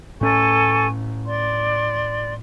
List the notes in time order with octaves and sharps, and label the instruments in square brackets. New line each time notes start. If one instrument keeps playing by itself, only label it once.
[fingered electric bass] A2 C#4 [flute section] A4 G#5 C#6
[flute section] D5 C6